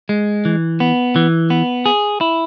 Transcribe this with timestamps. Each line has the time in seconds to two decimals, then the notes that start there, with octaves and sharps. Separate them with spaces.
0.09 G#3
0.45 E3
0.80 B3
1.16 E3
1.50 B3
1.86 G#4
2.21 E4